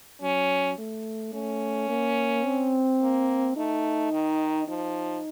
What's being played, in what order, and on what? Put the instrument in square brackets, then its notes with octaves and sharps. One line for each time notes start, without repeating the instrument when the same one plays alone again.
[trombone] F#3 [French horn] C#4
[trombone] A3
[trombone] A3 [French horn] C#4
[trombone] A#3
C4
[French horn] A#3
[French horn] A3 [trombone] D#4
[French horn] D#3
[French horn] F3 [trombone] D#4